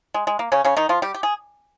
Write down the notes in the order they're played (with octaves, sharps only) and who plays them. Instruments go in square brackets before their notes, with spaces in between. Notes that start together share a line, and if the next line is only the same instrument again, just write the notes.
[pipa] G#3
G#3
A#3
C#3 C#4
C#3 C#4
D#3 D#4
F3 F4
G3 G4
G4
G#4